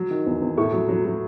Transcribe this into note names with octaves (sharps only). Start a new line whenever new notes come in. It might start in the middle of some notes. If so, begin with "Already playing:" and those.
Already playing: F#3
D#3
E2
E2
A2 C#6
F#3
F#3
F#3